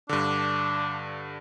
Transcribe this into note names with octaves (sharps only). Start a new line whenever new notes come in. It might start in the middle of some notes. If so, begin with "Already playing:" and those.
G2 D3 D4